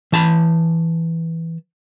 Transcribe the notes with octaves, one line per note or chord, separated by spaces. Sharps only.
E3 A5 B5